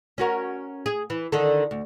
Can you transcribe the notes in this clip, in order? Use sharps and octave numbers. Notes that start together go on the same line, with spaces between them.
C#4 F#4 A#4
G#4
E3
D3 D#3 A4
D2